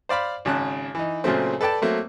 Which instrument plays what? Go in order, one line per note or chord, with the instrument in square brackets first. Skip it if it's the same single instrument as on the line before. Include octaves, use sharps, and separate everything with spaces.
[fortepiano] C5 D5 F5 B5
G#1 C#3 A5 F#6
E3 D#4
A#2 C#3 F#3 A3 C4
A4 B4 D5 G5 A5
F#3 A3 A#3 C4